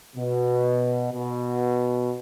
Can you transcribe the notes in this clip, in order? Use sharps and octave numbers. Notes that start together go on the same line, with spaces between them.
B2
B2